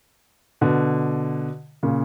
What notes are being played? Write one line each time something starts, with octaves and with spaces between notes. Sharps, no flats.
B2 D3
A#2 C#3